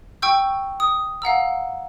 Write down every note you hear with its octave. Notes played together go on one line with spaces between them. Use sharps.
G5 C#6 E6 G6
D#6
F5 F#5 A#5 E6